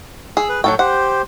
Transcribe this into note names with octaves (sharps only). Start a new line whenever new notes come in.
G#4 E6
B4
A2 F#3 F4 F#4 A4 G5
G4 C5 F#5